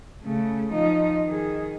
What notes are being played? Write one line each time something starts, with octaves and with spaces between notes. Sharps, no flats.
C#3 A3
F3 D#4
D#3 G#4